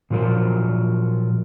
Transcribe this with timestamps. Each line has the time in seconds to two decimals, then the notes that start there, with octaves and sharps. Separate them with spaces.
0.10 A#2 F3 F#3 F4 A#4